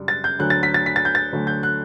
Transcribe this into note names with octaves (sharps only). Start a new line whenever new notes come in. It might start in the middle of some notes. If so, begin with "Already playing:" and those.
Already playing: F#2 C#3 G3 D4
A6
G6
D2 D3 F#3 F#6
A6
B6
A6
B6
A6
G6
A6
D2 D3 F#3 A3
G6
F#6